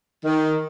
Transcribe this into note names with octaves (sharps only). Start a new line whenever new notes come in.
D#3